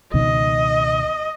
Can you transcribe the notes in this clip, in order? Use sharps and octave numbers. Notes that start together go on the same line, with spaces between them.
C#2 B2 D#3 D#5